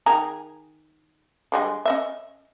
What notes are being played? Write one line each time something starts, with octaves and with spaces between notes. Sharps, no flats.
D#3 G#4 A#5
D3 G3 G#3
C#4 D#5 E5